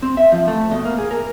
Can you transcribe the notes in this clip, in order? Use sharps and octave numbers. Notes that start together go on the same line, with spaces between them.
C4
E5
F3
A3
B2
A#3
G#4
A#4